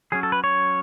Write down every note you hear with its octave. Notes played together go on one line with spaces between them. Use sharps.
F#3 C#4 G#4
A4
B4
C#5